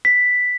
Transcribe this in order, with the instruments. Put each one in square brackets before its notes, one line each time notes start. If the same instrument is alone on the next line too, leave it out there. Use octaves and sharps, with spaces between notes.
[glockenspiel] B6